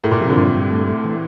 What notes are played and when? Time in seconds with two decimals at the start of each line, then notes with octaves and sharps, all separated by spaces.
0.04 A2 A#4
0.11 A#2
0.20 C3 F3
0.29 D3
0.36 G2 A#2
0.54 G2
0.70 A3
0.87 A3
1.05 E3